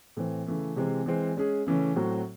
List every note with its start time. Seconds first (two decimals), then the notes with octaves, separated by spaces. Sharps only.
0.17 A2 E3 C4
0.47 C#3 E3 A3
0.76 C3 E3 G#3 C4
1.06 E3 G#3 C4
1.37 G#3 C#4 G#4
1.67 C#3 E3 A3 C#4
1.96 A2 F#3 C4 F#4